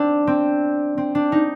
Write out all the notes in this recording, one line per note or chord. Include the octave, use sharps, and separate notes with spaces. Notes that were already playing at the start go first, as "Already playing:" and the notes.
Already playing: C4 D4
C4
C4
D4
D#4